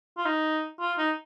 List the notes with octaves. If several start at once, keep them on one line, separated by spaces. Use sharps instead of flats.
F4
D#4
F4
D#4